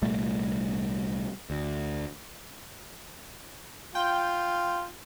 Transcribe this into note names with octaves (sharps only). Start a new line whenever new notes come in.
C2 A#2 G3 A3
D2
F4 G5